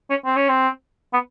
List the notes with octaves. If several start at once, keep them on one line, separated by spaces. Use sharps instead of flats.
C#4
C4
C#4
C4
B3